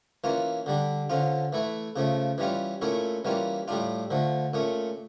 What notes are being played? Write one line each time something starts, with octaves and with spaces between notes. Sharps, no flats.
E3 A#3 C#4 F4
D3 G3 D4
D3 F3 C#4 F4
E3 A3 E4
C#3 F3 A3
E3 G3 C#4 F4
A#2 A3 C#4 E4
E3 G3 A#3 C#4 F4
A2 G3 D4 F4
D3 F3 A3
A#2 A3 C#4